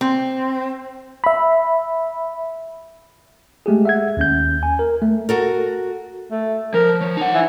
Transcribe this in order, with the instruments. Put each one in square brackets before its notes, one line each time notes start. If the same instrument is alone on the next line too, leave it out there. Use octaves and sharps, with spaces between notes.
[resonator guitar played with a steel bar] C4
[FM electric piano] E5 B5
[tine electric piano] G#3 A3 G4 G#4
E5 F#5 G#6
D#2 C#4 G6
G#5
A#4
A3
[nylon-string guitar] F#4 A4 A#4
[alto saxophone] A3
[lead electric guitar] F3 [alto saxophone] A#4
[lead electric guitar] F3 [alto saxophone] C#5
[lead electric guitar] D#4 F#5
[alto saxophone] E3